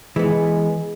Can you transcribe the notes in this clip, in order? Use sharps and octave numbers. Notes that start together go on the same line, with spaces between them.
E3 G#3 B3